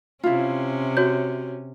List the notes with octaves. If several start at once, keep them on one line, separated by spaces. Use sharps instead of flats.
C3 C#4 E4 F4
F#4 C#5 G6